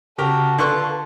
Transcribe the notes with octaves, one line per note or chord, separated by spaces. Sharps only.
C#3 F#4 G4 A4 A#4
D3 F4 A#4 B4 C#6